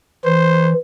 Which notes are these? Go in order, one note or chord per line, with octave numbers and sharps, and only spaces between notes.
E3 C5